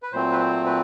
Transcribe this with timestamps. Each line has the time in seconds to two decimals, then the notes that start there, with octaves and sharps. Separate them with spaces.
0.03 B4
0.12 A#2 F#3 A3 C4 C5
0.32 B4
0.39 C5
0.66 B4